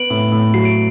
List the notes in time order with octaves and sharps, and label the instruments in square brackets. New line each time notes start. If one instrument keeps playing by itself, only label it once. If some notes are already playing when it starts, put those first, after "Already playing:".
Already playing: [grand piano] B3 [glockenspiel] D7 F#7
[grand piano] A2
A2
[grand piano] F#3 [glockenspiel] C7
[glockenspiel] D7